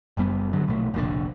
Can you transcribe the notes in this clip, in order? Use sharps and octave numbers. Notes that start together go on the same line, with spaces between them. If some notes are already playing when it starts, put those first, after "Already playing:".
F#1 F#2 G3 B3
G1 G2 D3 F#3
A#1 B2 A3
F1 A#1 A2 D3